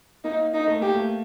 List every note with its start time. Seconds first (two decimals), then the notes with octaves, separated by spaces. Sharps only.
0.24 A#3 D#4
0.54 D#4
0.67 A3
0.81 A#3 G4
0.95 A3